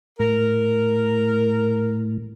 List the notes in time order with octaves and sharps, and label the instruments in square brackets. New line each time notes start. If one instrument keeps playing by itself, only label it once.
[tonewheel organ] A2 [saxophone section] A#4